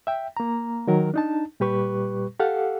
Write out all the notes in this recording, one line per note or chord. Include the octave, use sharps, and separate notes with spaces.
E5 G5
A#3 A#5
D#3 F#3 A#4
D4 D#4 A5
A#2 G3 G4 B4 C#6
G4 A4 F5 F#5